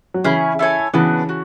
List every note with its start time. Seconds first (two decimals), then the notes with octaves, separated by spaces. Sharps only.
0.14 F#3
0.24 C#3 E3 C#4 E4 G#4
0.59 E4 A4 C#5 G#5
0.93 C#3 E3 B3 D4 F#4
1.29 F#4